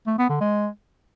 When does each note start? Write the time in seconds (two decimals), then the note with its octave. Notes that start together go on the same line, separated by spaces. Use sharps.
0.07 A3
0.18 B3
0.30 D3
0.41 G#3